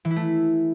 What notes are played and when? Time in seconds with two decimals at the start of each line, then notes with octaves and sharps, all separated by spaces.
0.05 E3
0.11 E4
0.16 A3